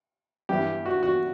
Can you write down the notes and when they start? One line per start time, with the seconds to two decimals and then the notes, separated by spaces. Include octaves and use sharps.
0.49 G2 E3 B3 E4 G4
0.86 F#4
1.03 F#4